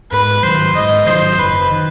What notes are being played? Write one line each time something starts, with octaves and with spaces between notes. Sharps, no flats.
G#2 B4
D#3 F#3 C5
G#2 D#5
D#3 F#3 C5
F#1 B4
D#3